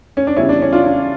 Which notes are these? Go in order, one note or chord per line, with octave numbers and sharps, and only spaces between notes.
C#4
D4
E2 C#3 G3 C#4 E4
D4
C#4
D4 F4
D4